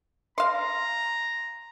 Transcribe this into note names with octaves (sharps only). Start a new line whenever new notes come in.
F5 A#5 C6